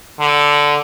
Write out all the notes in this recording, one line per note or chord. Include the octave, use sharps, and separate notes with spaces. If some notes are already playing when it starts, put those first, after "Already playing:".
D3